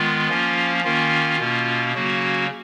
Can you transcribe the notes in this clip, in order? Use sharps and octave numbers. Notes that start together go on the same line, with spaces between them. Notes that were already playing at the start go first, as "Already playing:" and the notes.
Already playing: D#3 G#3 B3 F4
F3 A#3 C#4
D#3 A#3 C#4 F4
B2 A#3 C#4
C#3 F#3 A#3 C#4 F#4